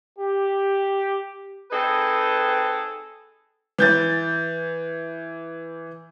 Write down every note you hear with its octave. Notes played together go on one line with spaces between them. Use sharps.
G4
C4 D#4 G#4 A4 B4
E3 G6 A6